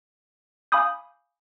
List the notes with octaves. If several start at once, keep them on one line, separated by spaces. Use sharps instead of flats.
F5 G#5 B5 D6 D#6 G6